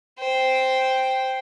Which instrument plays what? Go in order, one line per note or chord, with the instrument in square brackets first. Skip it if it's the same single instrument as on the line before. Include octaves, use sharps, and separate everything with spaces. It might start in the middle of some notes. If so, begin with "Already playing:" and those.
[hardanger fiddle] C5 G5